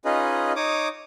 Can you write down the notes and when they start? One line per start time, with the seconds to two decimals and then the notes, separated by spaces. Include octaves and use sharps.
0.05 C#4 D#4 F4 G#4 B4 D#5
0.56 D#4 C#5 D6 D#6